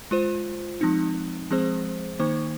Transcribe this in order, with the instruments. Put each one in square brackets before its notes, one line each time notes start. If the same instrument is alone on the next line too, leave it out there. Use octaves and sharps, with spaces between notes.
[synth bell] G#3 F4 C5
F3 G#3 C4 D#4
F3 G#3 C4 G#4 C5
D#3 A#3 D#4 C5